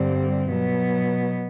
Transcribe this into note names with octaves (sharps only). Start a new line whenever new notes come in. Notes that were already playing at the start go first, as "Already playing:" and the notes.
Already playing: G2 D3 G3 C4
B2 F#3 B3